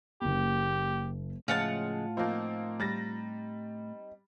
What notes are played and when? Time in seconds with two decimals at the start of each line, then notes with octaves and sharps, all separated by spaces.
0.21 F#1 A#3 G4
1.48 A2 C#3 F3 G#3 F4 F#5 A5
2.17 F3 A#3 C4 D#4
2.80 G3 A6 A#6